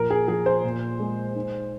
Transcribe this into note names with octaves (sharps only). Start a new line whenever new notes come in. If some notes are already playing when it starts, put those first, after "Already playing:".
Already playing: A#2 F3 A#4
G#4
F3 G#4
C5
A#2
G#3
D#4